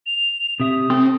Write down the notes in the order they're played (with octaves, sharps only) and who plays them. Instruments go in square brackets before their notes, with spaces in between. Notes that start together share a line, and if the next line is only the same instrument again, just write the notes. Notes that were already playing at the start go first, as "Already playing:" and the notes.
[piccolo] F7
[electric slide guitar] C3 G4 E5 [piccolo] D#6
[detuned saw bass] C4 [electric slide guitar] A4